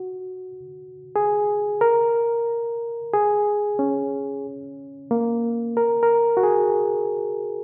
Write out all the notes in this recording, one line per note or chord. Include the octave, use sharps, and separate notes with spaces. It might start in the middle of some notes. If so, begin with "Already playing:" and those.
Already playing: F#4
G#4
A#4
G#4
C#4
A#3
A#4
A#4
F#4
G#4